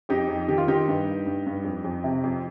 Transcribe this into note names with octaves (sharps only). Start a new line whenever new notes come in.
F2 D#4 G4
F2
D#3 G4
F4
D#3 D#4 G4
G2
G2
G2
G2
F2
F2
C3
F2